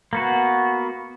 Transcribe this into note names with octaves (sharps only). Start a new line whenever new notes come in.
A#3 B3 F#4